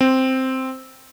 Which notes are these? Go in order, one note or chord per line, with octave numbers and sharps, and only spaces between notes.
C4